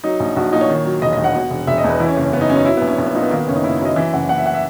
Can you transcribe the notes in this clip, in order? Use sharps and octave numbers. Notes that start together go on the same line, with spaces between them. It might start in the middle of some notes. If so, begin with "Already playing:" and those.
F#3 D#4
A#1
A#1 F#4
A#2 D#4
C#5
D#3
F#3
E1 D#5
D#5
D#2
F#5
B2
E1
E1 E5
D#5
E2
B4
E3 E4
C#4
F#1
C#4
F#1 B3
D#4
F#2 C#4
D#4
F#3 E4
A#1 B3
C#4
A#1
B3
A#2 D#4
B3
D#3 A#3
B3
F#1 C#4
D#4
F#1 E4
F#2
D#5
E3 E5
F#1 F#5
F#1 F#5
E5
F#5
E5